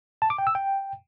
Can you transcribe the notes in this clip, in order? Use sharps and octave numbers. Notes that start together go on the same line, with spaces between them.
A5
D6
G5
E6
G5